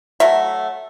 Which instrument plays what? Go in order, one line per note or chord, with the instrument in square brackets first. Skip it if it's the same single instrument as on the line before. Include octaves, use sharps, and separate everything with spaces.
[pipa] F#3 A3 E5